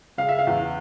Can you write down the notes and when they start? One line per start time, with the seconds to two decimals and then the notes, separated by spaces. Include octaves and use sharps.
0.18 C#3 F5
0.29 E5
0.39 F5
0.47 E2